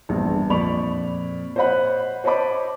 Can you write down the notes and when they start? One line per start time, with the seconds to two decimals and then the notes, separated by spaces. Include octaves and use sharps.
0.09 A#1 E2 G2
0.50 F2 A#2 D5 B5 C#6 F7
1.56 C5 C#5 D#5 F#5 B5 F#6
2.24 C5 C#5 D#5 A5 B5 D6